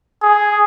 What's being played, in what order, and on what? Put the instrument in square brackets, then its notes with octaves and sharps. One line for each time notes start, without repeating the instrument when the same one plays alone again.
[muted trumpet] G#4